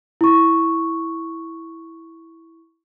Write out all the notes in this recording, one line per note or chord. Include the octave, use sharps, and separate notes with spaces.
E4 C#6